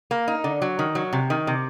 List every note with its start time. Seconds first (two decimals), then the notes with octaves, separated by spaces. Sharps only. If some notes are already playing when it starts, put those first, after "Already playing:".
0.11 A#3
0.28 D#4
0.44 D3
0.62 F#3
0.79 D#3
0.95 F#3
1.13 C3
1.30 D#3
1.47 C3